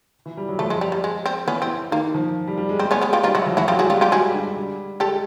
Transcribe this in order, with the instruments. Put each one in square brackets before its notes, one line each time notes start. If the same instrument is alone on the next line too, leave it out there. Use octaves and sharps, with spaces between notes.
[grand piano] E3
G3
F#3
[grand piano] F3 [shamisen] A3
[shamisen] G#3
G3
G3
G#3
C4
[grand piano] E3 [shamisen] B3 C#4
[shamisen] C4
[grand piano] D#3 [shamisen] A#3
[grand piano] F3
G3
G3
G#3
[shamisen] C4
B3 C#4
B3 C#4
F4 G4
[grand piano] G3 [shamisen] D#4 F4
[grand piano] F#3 [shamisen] E4 F#4
[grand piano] F3
[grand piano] E3 [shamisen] E4 F#4
[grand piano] F#3 [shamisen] F4 G4
[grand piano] G3 [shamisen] F#4 G#4
[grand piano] G#3 [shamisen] F4 G4
[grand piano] G3 [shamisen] F4 G4
[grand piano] G3 [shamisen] F#4 G#4
[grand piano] D3
G3
[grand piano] G#3 [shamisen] G4 A4